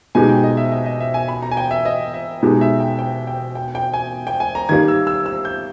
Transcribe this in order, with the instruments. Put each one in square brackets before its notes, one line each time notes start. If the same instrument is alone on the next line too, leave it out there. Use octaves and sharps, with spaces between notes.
[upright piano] B2 G#3 D#4 G4 [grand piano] G#5
[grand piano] G5
D#5
E5
D#5
D#5
E5
G#5
B5
A#5
G#5
G5
E5
D#5
E5
[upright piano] B2 G#3 D#4 G4
[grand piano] E5
G5
G5
G5
G5
G5
G#5
G5
G#5
A#5
[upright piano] D#3 G3 A#3 [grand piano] G#6
[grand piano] E6
E6
E6
G6